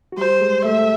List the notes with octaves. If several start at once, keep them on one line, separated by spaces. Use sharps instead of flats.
F#4
G3 G4 C5
G#3 G#4
A3 A4 E5
A4